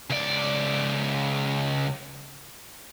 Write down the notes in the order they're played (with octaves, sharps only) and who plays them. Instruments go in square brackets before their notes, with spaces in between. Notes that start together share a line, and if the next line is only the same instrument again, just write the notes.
[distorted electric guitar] C#2 D5